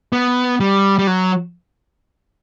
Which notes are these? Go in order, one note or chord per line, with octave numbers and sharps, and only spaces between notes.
B3
G3
G3
F#3